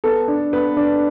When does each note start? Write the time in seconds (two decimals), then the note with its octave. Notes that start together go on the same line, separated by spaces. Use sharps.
0.04 B3 A4
0.28 D4
0.53 B3 B4
0.77 D4